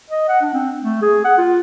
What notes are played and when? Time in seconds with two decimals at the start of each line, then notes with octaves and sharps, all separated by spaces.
0.10 D#5
0.28 F#5
0.42 D4
0.54 C4
0.82 A3
1.02 G#4
1.25 F#5
1.38 F4